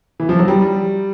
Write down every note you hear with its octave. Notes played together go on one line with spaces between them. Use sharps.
E3
F3
F#3
G3